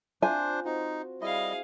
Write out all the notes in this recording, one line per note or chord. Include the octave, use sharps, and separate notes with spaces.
C4 D4 F4 C5 G#5
C4 D#4 F#4
G3 E4 G#4 D#5 F5